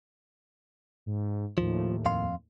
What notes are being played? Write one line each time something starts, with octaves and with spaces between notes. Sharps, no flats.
G#2
D#2 A2 F3
F2 F5 C6